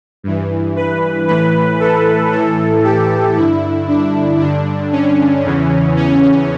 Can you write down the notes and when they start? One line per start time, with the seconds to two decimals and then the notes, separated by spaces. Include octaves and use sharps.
0.23 G2 E3
0.76 B4
1.27 A2 E3 B4
1.80 A4
2.32 A2 E3 A4
2.84 G4
3.36 G2 D3 E4
3.88 D4
4.40 G2 D3 D4
4.92 C#4
5.45 E2 C#3 E3
5.97 C#4